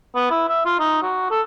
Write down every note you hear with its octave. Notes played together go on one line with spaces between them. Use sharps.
B3
E4
E5
F4
D#4
F#4
A4